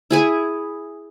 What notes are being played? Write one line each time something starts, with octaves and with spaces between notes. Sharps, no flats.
E4 G#4 G#5